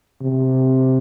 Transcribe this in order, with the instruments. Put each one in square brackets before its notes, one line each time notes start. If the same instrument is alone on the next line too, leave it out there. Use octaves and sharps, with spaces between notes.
[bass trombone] C3